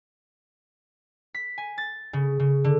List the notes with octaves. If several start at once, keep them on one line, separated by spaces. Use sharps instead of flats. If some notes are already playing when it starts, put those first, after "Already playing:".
B6
G#5
A6
C#3
C#3
D3